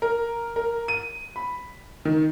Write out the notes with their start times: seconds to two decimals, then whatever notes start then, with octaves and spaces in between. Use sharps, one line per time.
0.02 A#4
0.56 A#4
0.88 D#7
1.36 B5
2.05 D#3